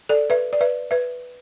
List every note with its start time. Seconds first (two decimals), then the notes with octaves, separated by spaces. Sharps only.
0.09 A4 D5
0.30 B4 E5
0.53 D5
0.61 B4 E5
0.91 B4 E5